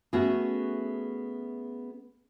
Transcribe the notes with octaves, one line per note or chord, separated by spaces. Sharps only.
A3 B3 C#4 F#4 G#4